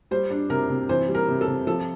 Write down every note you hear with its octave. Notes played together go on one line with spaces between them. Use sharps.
G3 C5
D4
C3 A#4
C3
E3 C5
G3
A#4
C3
A4
C3
F3 A4